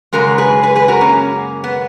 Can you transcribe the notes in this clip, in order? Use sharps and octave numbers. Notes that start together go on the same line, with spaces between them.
F#2 C#3 G#3 F#4 A#4
G#4 B4
G#4 B4
G#4 B4
F#4 A#4
A#3 C#4
B3